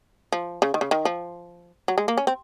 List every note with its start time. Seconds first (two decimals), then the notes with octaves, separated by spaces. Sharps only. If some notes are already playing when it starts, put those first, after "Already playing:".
0.32 F3
0.62 C#3
0.74 D#3
0.81 C#3
0.91 D#3
1.05 F3
1.88 F#3
1.98 G#3
2.08 A#3
2.17 C#4
2.27 C4